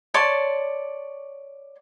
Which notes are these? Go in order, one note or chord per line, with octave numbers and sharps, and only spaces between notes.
C#5 D5 A5 C6